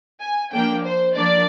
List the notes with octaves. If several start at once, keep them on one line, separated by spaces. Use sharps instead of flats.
G#5
F3 A#3 D4 G5
C5
F3 A#3 D4 D5